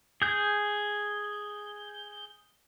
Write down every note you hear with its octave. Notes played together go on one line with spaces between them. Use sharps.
G#4 G6